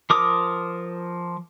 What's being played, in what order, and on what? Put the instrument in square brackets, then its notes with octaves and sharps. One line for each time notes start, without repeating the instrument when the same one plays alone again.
[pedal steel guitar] F3 A#4 D6 D#6